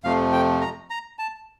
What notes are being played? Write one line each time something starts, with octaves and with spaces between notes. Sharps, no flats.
F2 C3 F3 A3 F5
G5
A#5
A#5
A5